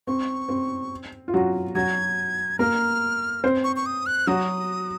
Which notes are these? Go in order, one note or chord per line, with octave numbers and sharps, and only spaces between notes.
C4 C#6
C4
F4
F#3 F#4
F#3 F#4 G#6
A#3 A#4 F6
C4 C5
C#6
C#6
D#6
F#6
F#3 F#4 D#6